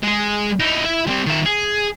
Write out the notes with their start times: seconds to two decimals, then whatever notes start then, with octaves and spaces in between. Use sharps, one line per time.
0.03 G#3 G#4
0.60 D#4 E4
0.84 E4 E5
1.07 G3 C4
1.26 D#3 E5
1.45 G#4